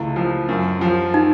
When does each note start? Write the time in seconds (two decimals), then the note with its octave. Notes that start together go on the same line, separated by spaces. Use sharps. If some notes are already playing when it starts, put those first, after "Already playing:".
Already playing: C#2 A3 E4
0.16 F3
0.49 F#2
0.81 F3
1.14 D#4